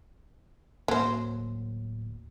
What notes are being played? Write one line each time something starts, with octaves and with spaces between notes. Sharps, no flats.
D1 F#3 A#3 C5